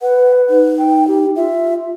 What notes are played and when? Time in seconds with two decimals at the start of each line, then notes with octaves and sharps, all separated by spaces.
0.02 B4 F#5
0.50 D#4
0.78 G5
1.08 G4
1.36 F4 E5